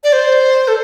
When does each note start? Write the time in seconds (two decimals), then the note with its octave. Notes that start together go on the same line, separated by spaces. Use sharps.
0.04 D5
0.13 C5
0.68 A4